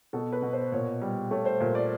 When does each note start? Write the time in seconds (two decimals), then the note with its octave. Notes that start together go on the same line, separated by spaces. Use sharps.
0.13 B2 A4
0.32 B4
0.42 B2
0.53 C5
0.72 A#2 C#5
1.02 G3
1.31 A3 C#5
1.45 C5
1.60 A#2
1.75 D5